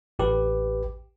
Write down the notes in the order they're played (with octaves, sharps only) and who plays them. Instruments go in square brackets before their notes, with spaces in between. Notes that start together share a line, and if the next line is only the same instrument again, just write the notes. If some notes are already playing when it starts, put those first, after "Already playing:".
[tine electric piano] A1 G4 B4